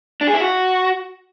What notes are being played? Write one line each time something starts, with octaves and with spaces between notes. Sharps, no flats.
D4
G#4
E4
F#4